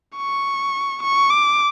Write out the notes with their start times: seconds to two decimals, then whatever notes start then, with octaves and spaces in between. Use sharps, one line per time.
0.17 C#6
1.03 C#6
1.31 D6